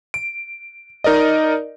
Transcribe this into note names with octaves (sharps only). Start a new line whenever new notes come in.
D7
D#4 A#4 D5 D#5